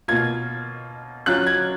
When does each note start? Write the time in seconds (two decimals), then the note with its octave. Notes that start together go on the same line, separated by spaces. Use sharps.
0.08 B2 A#3 F4 G#6
1.26 F#3 C#4 F4 F#6
1.47 G#6